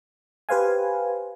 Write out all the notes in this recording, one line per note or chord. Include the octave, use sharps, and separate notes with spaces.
G4 B4 C5 F5 G#5